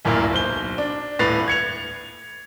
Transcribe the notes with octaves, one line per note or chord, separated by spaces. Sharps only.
D1 F#2 A#2 A#3 E4
B1 C5 G7
D4
D#1 A2 B4 A6 C7 F7
G#6 C#7 F7